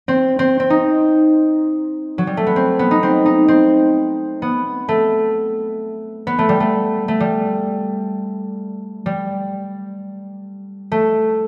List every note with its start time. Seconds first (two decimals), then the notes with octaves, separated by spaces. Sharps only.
0.08 C4
0.39 C4
0.60 C4
0.70 D#4
2.18 F#3
2.27 G3
2.37 A3
2.47 B3
2.56 C4
2.79 B3
2.91 D#4
3.03 C4
3.26 D#4
3.48 C4
4.42 B3
4.89 A3
6.27 B3
6.39 A3
6.49 G3
6.60 A3
7.08 A3
7.20 G3
9.06 G3
10.92 A3